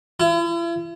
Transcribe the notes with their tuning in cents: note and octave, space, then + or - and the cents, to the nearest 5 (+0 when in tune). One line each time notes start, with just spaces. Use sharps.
E4 +45